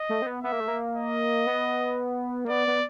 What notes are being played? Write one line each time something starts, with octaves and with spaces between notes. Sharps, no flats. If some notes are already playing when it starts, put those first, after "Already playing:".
Already playing: D#5
A3
C4
B3
B3 E5
A#3
A3
A#3
D#5
B3
A#3
B3 D5
B3